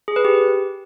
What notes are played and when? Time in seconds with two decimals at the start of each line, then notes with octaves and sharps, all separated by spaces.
0.08 G#4
0.16 B4
0.25 G4